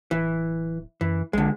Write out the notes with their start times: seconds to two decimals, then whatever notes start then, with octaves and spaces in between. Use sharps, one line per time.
0.11 D1 E3
1.01 F#2 E3
1.33 A#1 D3 G#3